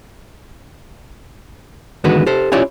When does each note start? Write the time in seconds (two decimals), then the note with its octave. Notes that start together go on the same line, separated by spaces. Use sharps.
2.04 E2 D3 D#3 G#3 F#4 B4
2.27 G4 A4 C5
2.52 C#4 E4 F4 G4 C#5 D5